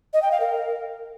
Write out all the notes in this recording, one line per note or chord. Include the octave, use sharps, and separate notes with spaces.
D#5
G5
F5
A#4